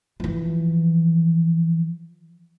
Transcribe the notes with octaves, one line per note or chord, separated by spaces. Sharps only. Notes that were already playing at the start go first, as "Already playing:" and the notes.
E3 F3